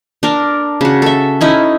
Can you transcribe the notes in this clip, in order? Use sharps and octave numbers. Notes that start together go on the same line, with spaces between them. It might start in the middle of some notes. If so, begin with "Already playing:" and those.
D4 A#4
C#3 F#4
A4 E5
C#4 D#4 E4